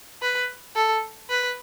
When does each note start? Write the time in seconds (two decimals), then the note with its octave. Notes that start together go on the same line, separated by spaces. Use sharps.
0.22 B4
0.76 A4
1.30 B4